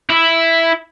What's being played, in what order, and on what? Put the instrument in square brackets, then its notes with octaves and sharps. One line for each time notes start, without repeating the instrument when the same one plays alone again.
[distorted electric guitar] E4